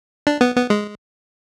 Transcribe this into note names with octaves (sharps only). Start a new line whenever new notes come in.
D4
B3
B3
G#3